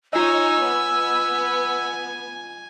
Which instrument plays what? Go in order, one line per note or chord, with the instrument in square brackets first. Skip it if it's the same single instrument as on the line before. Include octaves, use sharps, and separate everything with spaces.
[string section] D#4 C#5 [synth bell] F4 D#5 [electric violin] G#5 [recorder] E6
[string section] B3